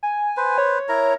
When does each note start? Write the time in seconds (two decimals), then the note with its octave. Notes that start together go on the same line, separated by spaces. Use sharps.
0.03 G#5
0.37 B4 C5
0.58 C#5
0.89 E4 A#4 A#5